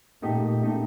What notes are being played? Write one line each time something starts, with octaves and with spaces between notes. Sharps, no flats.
A#2 A3 D#4 G4
A3 D#4 G4